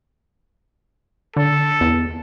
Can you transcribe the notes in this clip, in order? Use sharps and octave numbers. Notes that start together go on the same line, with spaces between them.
D3 A4
E2